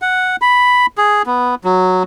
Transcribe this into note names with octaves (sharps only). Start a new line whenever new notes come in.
F#5
B5
G#4
B3
F#3